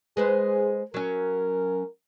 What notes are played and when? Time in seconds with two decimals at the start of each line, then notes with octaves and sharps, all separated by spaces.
0.17 G#3 G#4 B4 C5
0.94 F#3 C#4 A#4